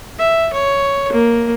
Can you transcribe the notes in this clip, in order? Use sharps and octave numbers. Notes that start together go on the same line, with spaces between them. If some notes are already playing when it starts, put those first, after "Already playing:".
E5
C#5
A#3